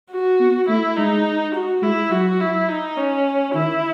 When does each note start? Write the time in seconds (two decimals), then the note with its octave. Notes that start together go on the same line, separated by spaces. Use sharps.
0.12 F#4
0.40 B3
0.68 A3 E4
0.96 G#3 D#4
1.54 F#4
1.82 G#3 E4
2.11 F#3 F#4
2.40 E4
2.69 D#4
2.97 C#4
3.54 D#3 E4